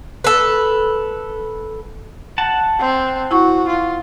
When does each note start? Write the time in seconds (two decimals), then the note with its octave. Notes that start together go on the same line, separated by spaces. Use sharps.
0.24 A4 B4
2.38 F#5 A5
2.80 C4
3.31 E4 F#4 C#6
3.68 F4